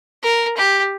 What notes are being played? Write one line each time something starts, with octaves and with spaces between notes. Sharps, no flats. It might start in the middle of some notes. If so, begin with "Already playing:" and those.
A#4
G4